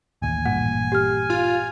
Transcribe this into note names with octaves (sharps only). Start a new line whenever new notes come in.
A1 D#2 G#5
A1 G2 A#2 F#5
G4 F6
F4